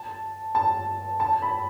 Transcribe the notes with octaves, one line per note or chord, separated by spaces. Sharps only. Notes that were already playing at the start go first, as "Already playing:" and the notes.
Already playing: A5
A5
A5
B5